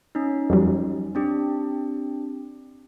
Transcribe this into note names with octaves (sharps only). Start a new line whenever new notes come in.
C#4 D#4
F2 F#3 G3
C4 D4 G4